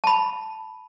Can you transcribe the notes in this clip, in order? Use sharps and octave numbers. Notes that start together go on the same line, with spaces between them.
A5 B5